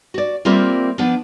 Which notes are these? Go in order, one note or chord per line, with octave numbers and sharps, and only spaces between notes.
F#4 D5
G3 A#3 C4 F4 A#4 E5
F3 B3 D4